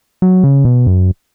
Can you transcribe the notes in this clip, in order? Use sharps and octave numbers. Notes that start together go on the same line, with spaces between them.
F#3
C#3
B2
F#2